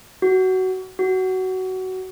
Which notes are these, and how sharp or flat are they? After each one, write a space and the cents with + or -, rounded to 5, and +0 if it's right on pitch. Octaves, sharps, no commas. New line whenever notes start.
F#4 +15
F#4 +15